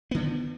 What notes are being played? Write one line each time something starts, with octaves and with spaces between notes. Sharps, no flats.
D3 D#3 B3